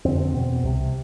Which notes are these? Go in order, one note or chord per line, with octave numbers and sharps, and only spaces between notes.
F2 D3 C4
C4
E2 B2
C2 C3